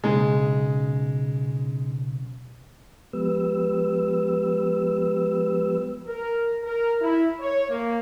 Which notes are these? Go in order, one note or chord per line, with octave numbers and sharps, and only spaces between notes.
B1 C#3 G#3
F3 G#3 B3 G4 B4 E6
A#4
A#4
E4
C#5
A#3